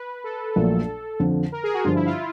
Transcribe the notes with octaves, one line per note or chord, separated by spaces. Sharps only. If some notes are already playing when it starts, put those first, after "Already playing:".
Already playing: B4
A4
A#1 A#2 F#3 A3
F2 D3 F3
A#4
G#4
F#4
G2 D3 F3 F4
E4
F4